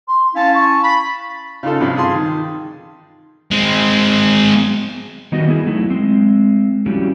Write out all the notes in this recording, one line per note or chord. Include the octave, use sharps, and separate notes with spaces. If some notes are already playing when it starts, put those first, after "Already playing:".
C6
C#4 E4 F5 A5
C#6
B5
C#3 D#4 F4 A4
G2 C3 F3
F4 G#4 A5 C6
D#3
G#3 C4
D#3 G3 B3 F#4 D#5
B3 E4 G#4
F#3 A3 D#4 E4
G#3 C4
F3 G3 C#4 E4 F#4 G4